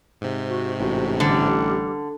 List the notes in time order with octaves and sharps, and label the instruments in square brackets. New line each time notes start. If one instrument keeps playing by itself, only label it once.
[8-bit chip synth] G#2 C3
[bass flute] F#4
[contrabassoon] A1 [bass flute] F#4
[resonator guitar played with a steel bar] D3 [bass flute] G3